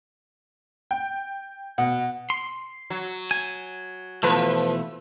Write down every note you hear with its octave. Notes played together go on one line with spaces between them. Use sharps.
G5
B2 F#5
C6
F#3
G#5
B2 E3 F3 A3 B4